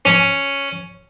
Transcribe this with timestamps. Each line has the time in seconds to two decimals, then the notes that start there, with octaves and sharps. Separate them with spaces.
0.05 C#4